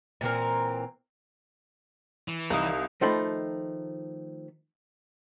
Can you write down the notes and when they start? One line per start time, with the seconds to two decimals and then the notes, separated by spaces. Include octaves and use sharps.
0.21 A#2 E3 C4 A#4
2.28 E3
2.50 C2 D#4 F5 A#5
3.01 D#3 F3 A3 D#4 C5 B5